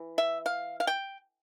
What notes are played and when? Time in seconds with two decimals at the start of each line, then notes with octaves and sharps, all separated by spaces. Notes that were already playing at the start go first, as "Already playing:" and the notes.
Already playing: E3
0.18 E5
0.46 F5
0.80 F5
0.87 G5